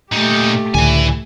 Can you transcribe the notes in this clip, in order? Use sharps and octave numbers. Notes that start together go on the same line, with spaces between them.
A#2 A3 D#4 G4
C#2 A2 D3 E3 G#5